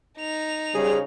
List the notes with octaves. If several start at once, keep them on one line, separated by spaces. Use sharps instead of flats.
D#4 F7
C#3 G3 G#4 C5